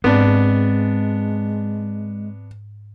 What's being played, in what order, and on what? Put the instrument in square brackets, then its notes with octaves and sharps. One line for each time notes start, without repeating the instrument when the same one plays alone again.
[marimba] G#2 [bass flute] G#3 [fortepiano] B3 D4 [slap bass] C4